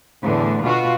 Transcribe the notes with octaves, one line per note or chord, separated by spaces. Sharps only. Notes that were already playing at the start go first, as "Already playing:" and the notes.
E2 A2 D3
B2 F4 F#4